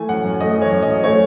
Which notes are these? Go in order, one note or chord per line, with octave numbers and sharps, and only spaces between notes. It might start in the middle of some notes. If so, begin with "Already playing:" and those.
Already playing: E3 A3 G#5
F#2 F#5
F#2
A3 D#5
E3
C#5
F#2
D#5
F#2
A3 C#5